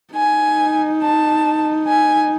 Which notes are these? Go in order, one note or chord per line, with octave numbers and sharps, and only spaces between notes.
D#4 G#5
A5
G#5